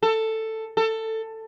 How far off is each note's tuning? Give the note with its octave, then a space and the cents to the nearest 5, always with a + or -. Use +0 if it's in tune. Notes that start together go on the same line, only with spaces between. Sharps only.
A4 +10
A4 +15